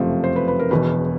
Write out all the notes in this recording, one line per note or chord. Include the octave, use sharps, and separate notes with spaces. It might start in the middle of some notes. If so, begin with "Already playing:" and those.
Already playing: F#1 F2 C3 F3 A3 C5
C5
B4
B4
A#4
E1 E2 B2 B4